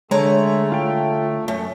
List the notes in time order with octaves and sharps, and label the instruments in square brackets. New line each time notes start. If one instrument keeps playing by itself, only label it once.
[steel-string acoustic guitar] D3 C#5 A#5 [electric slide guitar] G#3 [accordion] A3
[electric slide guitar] F4 G5
[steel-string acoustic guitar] F#2 [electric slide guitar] A3